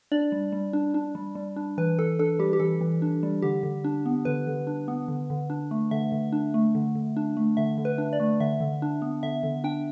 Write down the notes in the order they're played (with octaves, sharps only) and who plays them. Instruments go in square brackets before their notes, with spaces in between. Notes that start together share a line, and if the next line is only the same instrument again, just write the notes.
[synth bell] D4 D5
G3
G3
D4
D4
G3
G3
D4
E3 B4
E3 A4
D4 A4
G3 G4
G4
E3 A4
E3
D4
G3
D3 G4
D3
D4
B3
D3 B4
D3
D4
B3
D3
D3
D4
A3
D3 E5
D3
D4
A3
D3
D3
D4
A3
D3 E5
D3
B4
D4
D5
A3
D3 E5
D3
D4
B3
D3 E5
D3
D4 G5